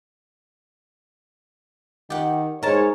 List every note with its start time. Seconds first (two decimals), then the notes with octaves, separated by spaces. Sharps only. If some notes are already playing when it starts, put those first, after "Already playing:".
2.10 D#3 G4 F#5
2.63 G#2 G#3 A#4 C#5 A5